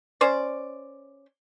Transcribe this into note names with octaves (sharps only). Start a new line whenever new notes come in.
C#4 C5 D5